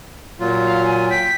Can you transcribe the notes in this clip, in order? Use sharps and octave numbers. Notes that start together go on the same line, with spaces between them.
A#2 F#3 F4
F5
G#5
G5 B6